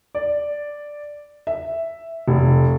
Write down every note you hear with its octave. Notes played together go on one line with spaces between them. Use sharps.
D5
E5
F1